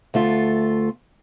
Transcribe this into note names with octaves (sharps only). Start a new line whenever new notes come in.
D2 A3 F4